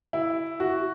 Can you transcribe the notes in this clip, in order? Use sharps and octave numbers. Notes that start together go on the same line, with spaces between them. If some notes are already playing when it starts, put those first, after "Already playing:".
E4
F#4